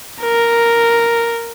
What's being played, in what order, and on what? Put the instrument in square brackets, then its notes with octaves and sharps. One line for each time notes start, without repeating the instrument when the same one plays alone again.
[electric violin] A#4